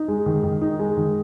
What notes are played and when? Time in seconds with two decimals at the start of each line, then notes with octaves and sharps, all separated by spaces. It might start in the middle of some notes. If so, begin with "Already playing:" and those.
Already playing: D#4
0.08 G#3
0.26 D#3
0.43 D#3
0.61 D#4
0.79 G#3
0.97 D#3